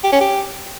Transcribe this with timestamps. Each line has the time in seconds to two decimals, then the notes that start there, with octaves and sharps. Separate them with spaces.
0.04 G4
0.12 C#4
0.21 G4